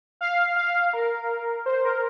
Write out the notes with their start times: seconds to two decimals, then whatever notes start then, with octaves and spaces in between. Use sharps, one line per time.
0.21 F5
0.56 F5
0.93 A#4
1.66 C5
1.85 A#4